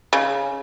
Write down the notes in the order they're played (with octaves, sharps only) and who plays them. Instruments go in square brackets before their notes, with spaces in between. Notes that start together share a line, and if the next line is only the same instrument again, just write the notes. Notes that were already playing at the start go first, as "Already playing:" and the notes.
[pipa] C#3